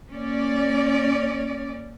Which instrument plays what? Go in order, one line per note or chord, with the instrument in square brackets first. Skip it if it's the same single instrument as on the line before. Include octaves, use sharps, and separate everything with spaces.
[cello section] A#3 C#4 D5